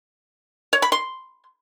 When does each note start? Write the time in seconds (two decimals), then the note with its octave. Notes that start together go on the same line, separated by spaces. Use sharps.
0.73 C#5
0.82 B5
0.92 C6